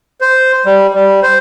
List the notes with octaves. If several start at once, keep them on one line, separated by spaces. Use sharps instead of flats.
C5
G3
G3
C5